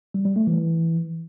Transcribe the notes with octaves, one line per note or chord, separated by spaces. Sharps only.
G3
G3
A3
E3